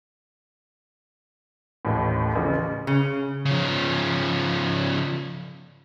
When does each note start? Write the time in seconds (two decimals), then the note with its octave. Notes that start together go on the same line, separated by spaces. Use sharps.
1.85 A1 D#2 A2
2.36 A1 C#3
2.87 C#3
3.45 C#3 F3